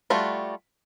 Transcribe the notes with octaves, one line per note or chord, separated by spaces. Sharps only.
G3 A3 F4 F#4